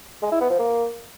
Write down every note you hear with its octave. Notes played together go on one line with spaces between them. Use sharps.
G#3
E4
B3
F3
A#3